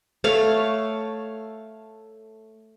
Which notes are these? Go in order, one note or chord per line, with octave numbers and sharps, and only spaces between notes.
A3 C#5 F5